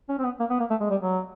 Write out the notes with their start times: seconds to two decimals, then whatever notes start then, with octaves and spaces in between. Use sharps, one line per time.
0.09 C#4
0.19 C4
0.24 B3
0.40 A#3
0.50 B3
0.60 A#3
0.70 A3
0.80 G#3
0.90 G3
1.01 F#3